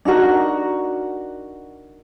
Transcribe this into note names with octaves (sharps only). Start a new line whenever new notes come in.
D4 D#4 F#4 A#4